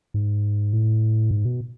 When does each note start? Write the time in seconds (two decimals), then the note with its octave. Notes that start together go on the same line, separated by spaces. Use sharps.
0.14 G#2
0.73 A2
1.31 G#2
1.45 B2